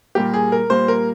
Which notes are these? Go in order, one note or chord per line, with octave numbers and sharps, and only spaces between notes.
A#2 G3 A#3 G4
G#4
A#4
A#2 G3 A#3 C5
A#4